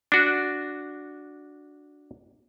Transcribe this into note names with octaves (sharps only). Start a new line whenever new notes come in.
D4 F#4